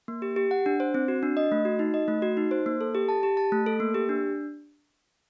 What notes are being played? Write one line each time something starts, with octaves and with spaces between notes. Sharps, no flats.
A#3
G4
G4
F#5
D4
C5
C4
F#4
D4
D#5
A3
F#4
D#4
D#5
A3
F#4
D#4
C5
A#3
A4
G4
A5
G4
A5
A3
A4
A#3
G4
D4